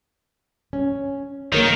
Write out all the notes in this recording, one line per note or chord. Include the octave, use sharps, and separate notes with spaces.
C#4
D#3 A#3 A#4 C#5